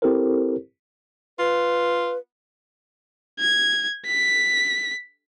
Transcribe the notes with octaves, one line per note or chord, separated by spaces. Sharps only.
C4 E4 G4 A4 A#4 C5
F4 B4
G#6
B6